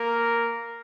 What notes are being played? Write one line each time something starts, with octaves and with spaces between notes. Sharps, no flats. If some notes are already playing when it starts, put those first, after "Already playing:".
Already playing: A#3 A#4